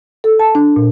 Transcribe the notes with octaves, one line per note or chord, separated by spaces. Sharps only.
A4
A5
D4
A#2